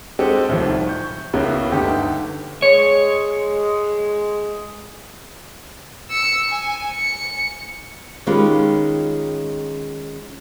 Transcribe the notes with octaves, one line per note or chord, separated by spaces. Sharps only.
G#3 C4 F#4 G4 A4 D#5
D1 C2 A2 D#3 F3
C#6 G6
C#2 C#3 A#3 B3 E4 F#4
G1 D2 D#4 G4 A4
G#3 C#5
E6 C#7
G#5
C#7
D#3 G#3 C#4 F4 G4 B4